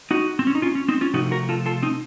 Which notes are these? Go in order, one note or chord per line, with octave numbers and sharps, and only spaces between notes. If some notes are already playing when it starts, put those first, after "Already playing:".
D#4 F#4
C4
C#4
D#4
C#4 F4
C#4
C4 D#4
C#4 F4
C3 F3 A3 D#4 F#4
F#4 A#4
F4 A4
F4 A4
C4 D#4